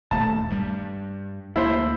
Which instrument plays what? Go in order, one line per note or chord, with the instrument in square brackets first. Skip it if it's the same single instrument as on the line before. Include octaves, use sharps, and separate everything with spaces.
[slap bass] D#1 D#2 A3 [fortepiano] A5
[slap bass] G2 G3
[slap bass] D2 A#3 [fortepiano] E4 C5